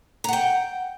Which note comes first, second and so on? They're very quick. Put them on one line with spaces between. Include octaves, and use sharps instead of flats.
A#5 F#5 G5